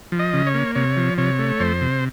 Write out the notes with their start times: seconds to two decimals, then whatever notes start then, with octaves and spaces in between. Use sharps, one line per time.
0.12 F3
0.19 D#5
0.33 C#3
0.47 C#5
0.54 A#3
0.75 C3 C#5
0.97 F3
1.18 C3 C#5
1.39 A3
1.60 F2 C5
1.81 C3